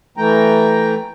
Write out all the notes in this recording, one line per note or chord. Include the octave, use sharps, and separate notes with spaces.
E3 A3 G5 A#5